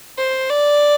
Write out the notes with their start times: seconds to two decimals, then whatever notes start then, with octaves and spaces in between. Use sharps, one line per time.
0.18 C5
0.50 D5